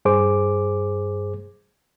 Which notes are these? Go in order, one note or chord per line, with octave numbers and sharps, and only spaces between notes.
G2 G#4 C5 D6